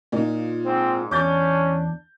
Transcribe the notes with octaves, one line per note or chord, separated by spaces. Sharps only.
A#2 D#4 F4
G#2 C4
E2 C#4 D4 D6 G6 A6